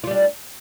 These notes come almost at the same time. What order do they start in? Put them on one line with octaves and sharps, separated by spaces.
F4 G3 D4